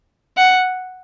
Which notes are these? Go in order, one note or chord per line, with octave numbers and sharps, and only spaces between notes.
F#5